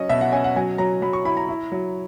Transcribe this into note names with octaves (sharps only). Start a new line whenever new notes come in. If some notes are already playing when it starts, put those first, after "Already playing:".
Already playing: F#3 C#4 D#5
B2 E5
F#5
C#4 G#5
F#5
F#3 G#5
F#3 A#5
F#3 B5
C#6
E4 B5
A#5
E4
F#3